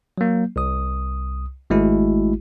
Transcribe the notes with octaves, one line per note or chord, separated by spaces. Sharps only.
F#3 A#3
C2 D#6
G#1 G#3 A3 E4 F#4